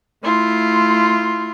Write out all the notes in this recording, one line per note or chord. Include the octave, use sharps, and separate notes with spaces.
A3 E4 F4 C6